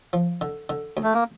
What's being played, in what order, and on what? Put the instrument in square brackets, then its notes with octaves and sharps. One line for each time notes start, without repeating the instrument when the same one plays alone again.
[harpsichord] F3
D3
D3
D2
[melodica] A3
A#3